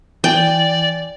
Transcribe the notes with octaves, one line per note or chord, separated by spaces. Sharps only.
E3 D5 G5 G#5